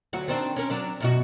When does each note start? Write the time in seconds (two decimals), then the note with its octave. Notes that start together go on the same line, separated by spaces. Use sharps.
0.13 D2 F#3 F#4
0.28 D#3 C4 D4
0.56 C#4 A#4
0.70 F#3 D4 D5
1.01 F#2 B2 F#4